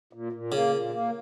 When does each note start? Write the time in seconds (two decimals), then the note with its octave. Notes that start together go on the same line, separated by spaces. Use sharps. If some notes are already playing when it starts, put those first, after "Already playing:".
0.13 A#2
0.33 A#2
0.52 C#3 A#3
0.72 A#2
0.91 A#3